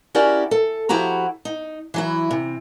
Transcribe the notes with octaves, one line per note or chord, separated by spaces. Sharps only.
C#4 E4 F#4 G4 A#4 D5
A4
F3 E4 F#4 G4 A#5
D#4
E3 F#3 E4
C3